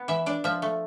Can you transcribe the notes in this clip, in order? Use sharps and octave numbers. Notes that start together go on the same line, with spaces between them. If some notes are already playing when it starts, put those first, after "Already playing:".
Already playing: B3
E3 E5
D4 D5
F3 E5
A3